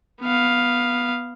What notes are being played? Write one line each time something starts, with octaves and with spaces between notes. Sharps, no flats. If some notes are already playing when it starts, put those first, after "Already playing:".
B3 F5